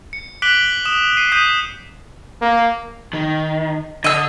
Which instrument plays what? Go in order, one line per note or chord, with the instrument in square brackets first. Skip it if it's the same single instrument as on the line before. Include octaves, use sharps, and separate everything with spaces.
[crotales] C#7
D6 F#6 B6 D7 F#7 G7
D#6 E7
C7 D#7
D#6 G6 B6 D#7
[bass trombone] A#3
[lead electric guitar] D#3
[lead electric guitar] D3 [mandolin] D#5 E6